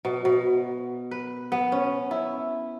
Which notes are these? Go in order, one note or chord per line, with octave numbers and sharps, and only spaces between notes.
B2
B2
B4
B3
C#4
E4